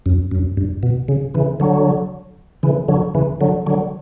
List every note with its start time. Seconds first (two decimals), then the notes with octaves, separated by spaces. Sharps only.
0.06 F#2
0.31 F#2
0.57 G2
0.83 B2
1.08 C#3
1.34 C#3 E3
1.60 D3 F#3
2.63 C#3 E3
2.88 D3 F#3
3.15 C#3 E3
3.41 D3 F#3
3.66 D3 F#3